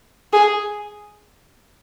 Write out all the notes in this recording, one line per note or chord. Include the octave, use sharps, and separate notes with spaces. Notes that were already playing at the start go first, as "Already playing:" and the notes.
G#4